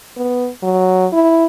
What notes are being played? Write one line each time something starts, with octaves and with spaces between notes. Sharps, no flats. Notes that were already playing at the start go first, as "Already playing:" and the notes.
B3
F#3
E4